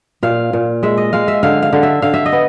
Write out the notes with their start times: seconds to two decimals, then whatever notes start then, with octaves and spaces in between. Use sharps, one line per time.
0.23 A#2 F5
0.53 A#2
0.83 G#3 E5
0.98 D#5
1.13 G#3 F5
1.28 E5
1.43 D3 F5
1.62 F5
1.73 D3
1.83 E5
2.02 D3 F5
2.14 E5
2.26 D#5
2.32 B3